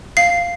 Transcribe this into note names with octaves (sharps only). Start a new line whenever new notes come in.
F5 C7